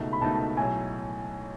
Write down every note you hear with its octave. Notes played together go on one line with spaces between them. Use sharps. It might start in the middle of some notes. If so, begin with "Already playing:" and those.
Already playing: C#2 B2 A3 D#4
B5
C#2 B2 A3 D#4 A5
B1 A2 F#3 G#5